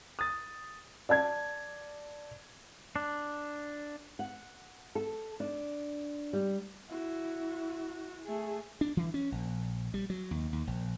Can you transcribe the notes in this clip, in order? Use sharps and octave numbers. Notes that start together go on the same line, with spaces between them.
D#6 A6
D5 A5 G#6
D4
F#5
A4
D4
G3
E4 F#4
A3 G#4
D4
E3
C#4
A#1
G3
F#3
D#2
D#2
A#1